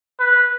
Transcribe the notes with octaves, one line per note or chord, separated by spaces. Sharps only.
B4